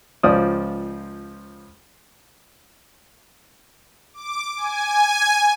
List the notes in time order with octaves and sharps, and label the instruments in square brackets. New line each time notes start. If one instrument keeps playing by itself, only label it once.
[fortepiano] C#2 F3 D5 D#6
[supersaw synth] D6
G#5